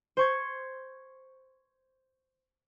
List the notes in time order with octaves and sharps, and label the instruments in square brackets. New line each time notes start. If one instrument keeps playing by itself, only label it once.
[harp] C5 C#6 G#6